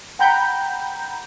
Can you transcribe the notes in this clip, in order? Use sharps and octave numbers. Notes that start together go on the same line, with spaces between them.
F#5 G5 A#5 B5 G6